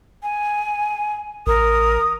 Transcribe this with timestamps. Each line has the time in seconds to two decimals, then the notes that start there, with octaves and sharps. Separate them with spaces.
0.23 G#5
1.47 A1 A#4 D#6